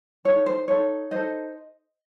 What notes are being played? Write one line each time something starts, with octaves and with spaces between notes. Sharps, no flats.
D#4 A4 C#5
C5
D#4 A4 C#5
D#4 A4 C5 D#5